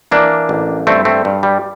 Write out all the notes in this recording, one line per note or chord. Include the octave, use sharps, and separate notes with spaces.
E3 A#3 D4
A1
G2 A3 C4
A3 C4
G2
G3